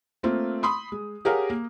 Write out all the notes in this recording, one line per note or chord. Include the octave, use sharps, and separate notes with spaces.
A3 A#3 C4 F4
B5 C6 D#6
G#3
G4 G#4 A#4 C#5 F5 F#5
A#3